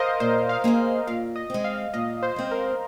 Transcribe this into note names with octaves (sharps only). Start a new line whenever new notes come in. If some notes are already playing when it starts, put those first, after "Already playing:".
Already playing: A#4 C5 D#5 F5
A#2 C5
F5
A#3 G#4 C5
A#2 F5
D#5
G#3 C4
F5
A#2 D#5
C5
G#3 C4
A#4